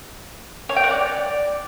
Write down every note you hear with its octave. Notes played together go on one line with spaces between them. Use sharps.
C#5
G5
F#5
D5